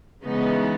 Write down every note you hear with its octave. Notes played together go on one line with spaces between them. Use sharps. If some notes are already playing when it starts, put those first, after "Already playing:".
C#3 E3 G#3 B3 D#4